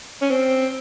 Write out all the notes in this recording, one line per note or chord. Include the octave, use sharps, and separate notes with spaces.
C#4
C4